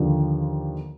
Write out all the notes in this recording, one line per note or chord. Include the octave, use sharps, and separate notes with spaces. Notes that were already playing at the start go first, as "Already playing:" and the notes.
Already playing: D#2 D3 F3